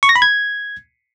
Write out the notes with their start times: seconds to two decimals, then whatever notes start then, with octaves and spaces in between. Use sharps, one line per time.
0.03 C#6
0.09 A#6
0.16 B5
0.22 G#6